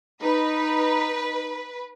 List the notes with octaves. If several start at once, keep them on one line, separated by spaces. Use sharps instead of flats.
D#4 B4